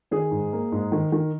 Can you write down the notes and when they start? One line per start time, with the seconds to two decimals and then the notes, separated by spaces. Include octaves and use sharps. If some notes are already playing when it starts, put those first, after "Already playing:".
0.11 D#3 G#4
0.31 G#2
0.52 A#3
0.72 G#2
0.92 D#3
1.12 D#3